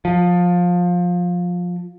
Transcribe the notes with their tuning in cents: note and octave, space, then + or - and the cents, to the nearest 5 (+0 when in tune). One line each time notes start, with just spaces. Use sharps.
F3 +20